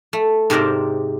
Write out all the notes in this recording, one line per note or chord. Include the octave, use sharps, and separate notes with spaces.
A3
G#2 C3 C4 A#4 D5